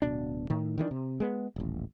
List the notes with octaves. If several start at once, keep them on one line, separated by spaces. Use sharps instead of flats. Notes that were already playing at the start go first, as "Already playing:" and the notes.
D1 B2 D4
A2 D#3
D#3 E3 G#3 D4
C3
G#3 B3
D#1 A1